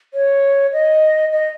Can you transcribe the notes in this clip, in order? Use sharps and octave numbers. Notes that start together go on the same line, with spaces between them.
C#5
D#5
D#5